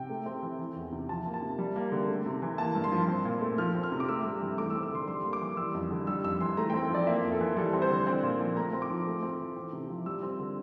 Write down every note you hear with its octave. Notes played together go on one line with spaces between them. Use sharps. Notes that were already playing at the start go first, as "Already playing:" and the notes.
Already playing: C3 G5
A3
C4
E3
E3
E2
C3
F3 A5
A#3
A5
C3
G3
A#3
D3
A3
C3
E3
A#3 A5
G2
C6
F3
C4
A#2
A3
F3 F6
C4
F6
C3
D6
A3 E6
G2
E3
A3 D6
E6
C4
E6
D3 C6
G3 C6
A#3
D6
E3
G3 E6
F2
D3
G3 E6
F2 E6
E3 C6
A3 A#5
C4 G5
F3 D5
A#3 E5
F2
A4
E3
G3 A4
C4
C5
D3
C4 D5
A#2
F3
A3 A#5
C4
D6
F3
A3
C4
E3
C4
C3
F3
G3 E6
C4
D3